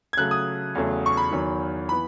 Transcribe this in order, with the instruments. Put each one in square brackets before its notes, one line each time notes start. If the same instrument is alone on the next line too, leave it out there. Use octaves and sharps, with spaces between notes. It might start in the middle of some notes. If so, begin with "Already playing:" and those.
[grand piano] G#6
C#3 F#3 A3 F#6
D#6
E2 C#3 F#3 A3
C#6
B5
E2 D#3 F#3
E3 B3 B5